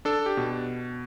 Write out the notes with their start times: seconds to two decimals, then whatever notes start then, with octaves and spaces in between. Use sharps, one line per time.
0.05 D4 A4
0.26 G4
0.37 B2